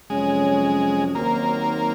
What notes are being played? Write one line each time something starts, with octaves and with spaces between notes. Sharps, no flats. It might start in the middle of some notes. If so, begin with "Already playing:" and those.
F2 C3 F#3 G#3 C#4
D#2 D#3 F#3 A#3 C4